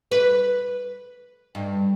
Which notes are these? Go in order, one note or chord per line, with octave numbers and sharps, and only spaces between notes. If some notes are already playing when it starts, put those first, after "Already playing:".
B4
G2